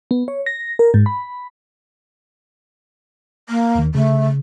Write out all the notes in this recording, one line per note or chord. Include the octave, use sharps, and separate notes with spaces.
B3
C#5
A#6
A#4
G#2
B5
A#3
D#2 D#3
C#3 A3